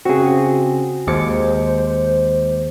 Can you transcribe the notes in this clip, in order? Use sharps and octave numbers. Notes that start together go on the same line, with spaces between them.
C#3 C4 F#4 G#4
D#2 G#3 C5 D6 C#7